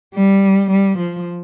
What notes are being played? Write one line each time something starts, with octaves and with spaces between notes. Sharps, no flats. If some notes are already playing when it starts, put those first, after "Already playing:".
G3
G3
F3